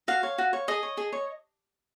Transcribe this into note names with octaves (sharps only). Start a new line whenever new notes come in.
F#4 F5
C#5
F#4
C#5
G#4 D#5
C#5
G#4
C#5